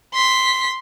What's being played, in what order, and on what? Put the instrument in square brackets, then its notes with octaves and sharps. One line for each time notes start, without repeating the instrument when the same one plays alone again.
[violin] C6 B6